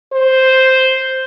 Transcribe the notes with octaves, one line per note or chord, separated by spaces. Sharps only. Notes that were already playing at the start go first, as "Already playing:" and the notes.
C5